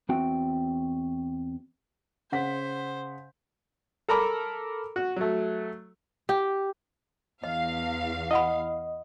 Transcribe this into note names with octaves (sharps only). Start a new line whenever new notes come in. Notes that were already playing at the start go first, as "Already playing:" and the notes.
E2 C4 F#4 E5 G5
C#3 C5 F#5 B6
A4 A#4 A#5 B5 D6
F#4
F#3 A3
G4
E2 D#5 F5
E4 D#5 F#5 B5